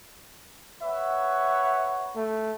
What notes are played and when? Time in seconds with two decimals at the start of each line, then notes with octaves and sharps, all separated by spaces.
0.82 B4 C#5 E5 F#5
2.16 A3